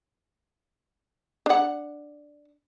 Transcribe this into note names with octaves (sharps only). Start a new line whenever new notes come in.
D4 F#5